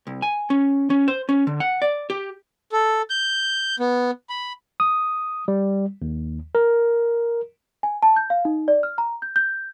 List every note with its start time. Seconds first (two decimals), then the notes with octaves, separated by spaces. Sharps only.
0.07 C2
0.22 G#5
0.50 C#4
0.90 C#4
1.08 C5
1.29 C#4
1.47 D3
1.60 F#5
1.82 D5
2.10 G4
2.72 A4
3.10 G6
3.80 B3
4.30 B5
4.80 D#6
5.48 G3
6.02 D#2
6.55 A#4
7.83 G#5
8.03 A5
8.16 G6
8.30 F5
8.45 D#4
8.68 D5
8.83 F6
8.98 A#5
9.22 G6
9.36 G6